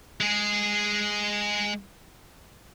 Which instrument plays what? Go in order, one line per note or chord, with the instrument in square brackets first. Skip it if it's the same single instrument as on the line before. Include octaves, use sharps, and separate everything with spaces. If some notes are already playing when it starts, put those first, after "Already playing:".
[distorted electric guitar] G#3 G#4